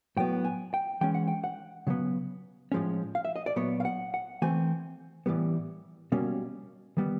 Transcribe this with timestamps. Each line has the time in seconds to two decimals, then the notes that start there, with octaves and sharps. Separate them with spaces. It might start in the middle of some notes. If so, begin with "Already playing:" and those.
0.17 A2 F#3 B3 G5
0.45 G#5
0.74 G5
1.01 E3 G#3 C#4 G5
1.14 F#5
1.28 G5
1.44 F#5
1.87 C#3 F#3 B3
2.72 A2 F3 G#3 C#4
3.15 F5
3.25 E5
3.36 D#5
3.46 D5
3.56 A#2 F#3 B3 C#5
3.80 F5
3.85 F#5
4.14 F#5
4.42 E3 A3 C4 G#5
5.26 A2 E3 G3 B3
6.12 B2 G3 A#3 C#4
6.97 D#3 G3 B3